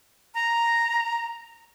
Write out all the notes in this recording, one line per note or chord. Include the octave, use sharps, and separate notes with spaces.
A#5